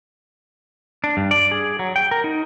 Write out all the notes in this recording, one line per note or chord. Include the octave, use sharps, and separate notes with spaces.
D4
G2
D5
G#4
F#3
G5
A#4
D#4